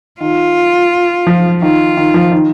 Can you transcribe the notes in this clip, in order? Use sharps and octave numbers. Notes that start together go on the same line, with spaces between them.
D#3 F4
F3
D#3 F4
D#3
F3
D#3